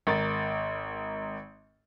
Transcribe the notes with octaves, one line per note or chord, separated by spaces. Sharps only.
G#1 A#4 A6